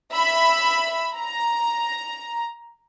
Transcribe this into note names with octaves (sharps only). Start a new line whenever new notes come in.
E5 B5
A#5